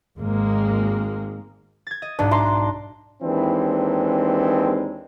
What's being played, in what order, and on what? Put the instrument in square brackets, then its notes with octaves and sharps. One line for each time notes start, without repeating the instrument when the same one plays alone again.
[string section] G#1 G#3 A#3
[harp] G#6 A6
D#5
[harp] B1 G#2 [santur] D4
[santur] A#5 C6 D6
[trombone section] D#2 E3 G#3 C4 D4